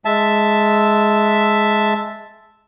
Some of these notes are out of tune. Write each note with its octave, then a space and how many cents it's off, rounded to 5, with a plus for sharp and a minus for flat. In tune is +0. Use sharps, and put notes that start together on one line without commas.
G#3 +10 E5 +0 A5 +0